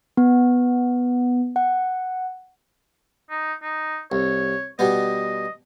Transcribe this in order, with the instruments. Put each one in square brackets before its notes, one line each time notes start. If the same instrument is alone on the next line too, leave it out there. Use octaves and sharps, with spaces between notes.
[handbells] B3
F#5
[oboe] D#4
D#4
[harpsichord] C2 [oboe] C#5
[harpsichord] B2 G3 B3 [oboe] D#5